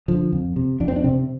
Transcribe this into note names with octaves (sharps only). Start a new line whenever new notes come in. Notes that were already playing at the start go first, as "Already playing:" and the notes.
D3 F3
F2
C3
F2 D4
C4
D4
C3 C4